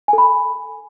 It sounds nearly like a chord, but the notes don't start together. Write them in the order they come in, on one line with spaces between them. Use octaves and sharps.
G#5 A4 B5